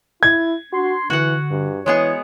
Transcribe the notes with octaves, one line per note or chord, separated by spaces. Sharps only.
E4 G#6
D4 F#4 C6
D3 E3 F#4 F#5
G2
E3 G#3 B3 G#4 C#5